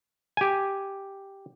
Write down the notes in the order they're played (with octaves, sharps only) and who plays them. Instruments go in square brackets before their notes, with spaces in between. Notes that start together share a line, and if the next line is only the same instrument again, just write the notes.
[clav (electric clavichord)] G4 G#5